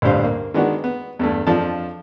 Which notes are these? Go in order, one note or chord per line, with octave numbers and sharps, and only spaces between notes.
A1 D2 G2 G3 C5 F5
A#3
D#3 G#3 B3 D4 F#4
B3
E2 G2 A3
F2 F3 D4 A4 A5